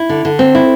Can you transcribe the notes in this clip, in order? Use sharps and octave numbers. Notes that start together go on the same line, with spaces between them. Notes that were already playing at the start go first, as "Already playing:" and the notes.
Already playing: E4
D3
D3
C4
E4